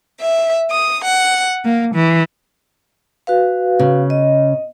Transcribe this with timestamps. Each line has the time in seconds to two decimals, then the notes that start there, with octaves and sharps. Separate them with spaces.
0.20 E5
0.71 D#6
1.04 F#5
1.64 A#3
1.94 E3
3.27 F#4 B4 F5
3.79 C#3
4.10 D#5